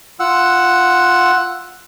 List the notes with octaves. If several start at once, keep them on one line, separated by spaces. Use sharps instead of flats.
F4 F#5 E6